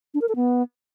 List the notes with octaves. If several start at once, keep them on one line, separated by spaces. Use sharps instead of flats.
D4
A#4
A4
B3